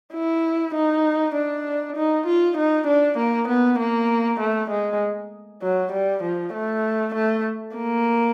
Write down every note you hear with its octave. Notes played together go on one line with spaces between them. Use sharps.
E4
D#4
D4
D#4
F4
D#4
D4
A#3
B3
A#3
A3
G#3
F#3
G3
F3
A3
A3
A#3